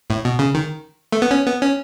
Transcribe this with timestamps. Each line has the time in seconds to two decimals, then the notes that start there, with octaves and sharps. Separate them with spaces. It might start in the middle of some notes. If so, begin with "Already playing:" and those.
0.10 A2
0.25 B2
0.39 C#3
0.55 D#3
1.12 A3
1.22 B3
1.31 C#4
1.46 B3
1.62 C#4